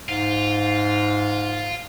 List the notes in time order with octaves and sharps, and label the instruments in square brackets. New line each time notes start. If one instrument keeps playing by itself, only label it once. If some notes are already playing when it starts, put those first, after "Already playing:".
[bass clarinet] G#2 [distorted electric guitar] F4